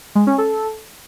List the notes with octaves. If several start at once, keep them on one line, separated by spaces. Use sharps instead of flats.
G#3
C#4
A4